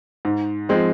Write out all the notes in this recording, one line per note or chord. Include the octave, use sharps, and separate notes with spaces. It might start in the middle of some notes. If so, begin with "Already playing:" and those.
G#2
F3 G#3 C4